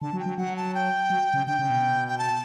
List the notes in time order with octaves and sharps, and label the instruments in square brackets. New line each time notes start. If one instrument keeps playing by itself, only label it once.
[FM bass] D3 [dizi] A5
[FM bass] F#3
[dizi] G5
[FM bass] F#3
[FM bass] F#3 [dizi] F#5
[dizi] A5
G5
[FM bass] F#3
C#3
[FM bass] D3 [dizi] G5
[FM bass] C#3
B2
[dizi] G5
A5